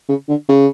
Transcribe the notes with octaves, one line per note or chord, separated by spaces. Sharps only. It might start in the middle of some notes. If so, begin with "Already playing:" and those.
C#3
D3
C#3